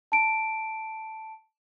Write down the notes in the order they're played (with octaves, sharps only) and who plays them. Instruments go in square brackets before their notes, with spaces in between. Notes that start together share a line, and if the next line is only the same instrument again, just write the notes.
[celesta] A5 D7